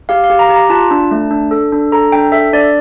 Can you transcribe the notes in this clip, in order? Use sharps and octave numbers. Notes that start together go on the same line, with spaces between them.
G4 F5
F5
G4
A#5
G4
A#5
F4 A5
D4
A3
D4
A4
D4
A4 A#5
D4 G5
A4 E5
D4 D5